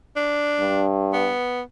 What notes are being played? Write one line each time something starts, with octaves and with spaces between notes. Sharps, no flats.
D4
G2
B3